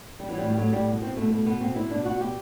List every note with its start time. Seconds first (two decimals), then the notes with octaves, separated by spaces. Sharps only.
0.20 G3
0.28 E3 F#3
0.38 G3
0.43 A2
0.48 G3
0.57 A2 F#3
0.72 A2 G3
0.88 B2
1.02 B2 C4
1.17 B2 A3
1.32 B2 A3
1.46 B2 B3
1.61 B2 C4
1.76 B2 E4
1.91 B2 D4
2.05 B2 F#4
2.20 B2 G4